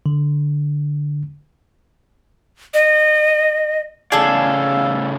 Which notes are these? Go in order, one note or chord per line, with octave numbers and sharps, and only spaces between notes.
D3
D#5
A2 C#3 G#4 A4 D5 F5